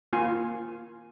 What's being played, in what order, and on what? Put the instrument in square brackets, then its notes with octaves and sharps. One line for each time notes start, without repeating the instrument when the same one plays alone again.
[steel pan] A#3 F4 G#5